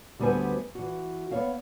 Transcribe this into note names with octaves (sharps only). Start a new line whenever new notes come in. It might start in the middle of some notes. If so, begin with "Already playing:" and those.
D2 G3 B3 B4 C5 G#5
E3 F#4
B3 C#5 F5